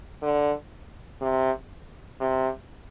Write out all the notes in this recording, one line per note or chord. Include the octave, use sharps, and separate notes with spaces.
D3
C3
C3